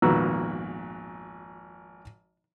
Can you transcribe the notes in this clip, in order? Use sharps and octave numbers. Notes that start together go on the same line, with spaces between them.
G#1 F2 A#2 B3 F#4 E6